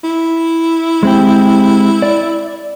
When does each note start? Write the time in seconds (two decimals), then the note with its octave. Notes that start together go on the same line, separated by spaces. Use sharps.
0.04 E4
1.03 G#3 C4 G4
2.02 D5